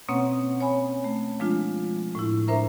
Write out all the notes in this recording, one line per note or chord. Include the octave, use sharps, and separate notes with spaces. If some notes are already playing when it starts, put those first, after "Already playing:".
B2 A#3 C4 C#4 C#5 F#5
C#5 G#5 B5
A3
F3 G#3 D4 F4
A2 E4
D4 A#4 C5 E5 A#5